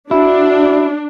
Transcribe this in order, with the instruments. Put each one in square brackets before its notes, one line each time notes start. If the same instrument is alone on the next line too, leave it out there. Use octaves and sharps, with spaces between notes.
[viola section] D4 [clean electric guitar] E4 [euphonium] F#4